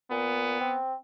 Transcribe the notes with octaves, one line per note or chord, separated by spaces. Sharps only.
A#2 B3
C4